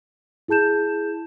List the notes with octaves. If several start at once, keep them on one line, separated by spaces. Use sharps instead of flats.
E4 G#4 A5 G6 E7